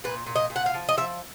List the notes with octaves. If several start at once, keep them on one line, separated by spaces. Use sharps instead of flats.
A#2 B4
A#2
D#5
A#2
F#5
F5
F3
D#5
F3 E5